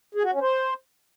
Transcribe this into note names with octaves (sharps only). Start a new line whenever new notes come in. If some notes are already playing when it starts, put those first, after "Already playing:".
G#4
F#4
C#4
C5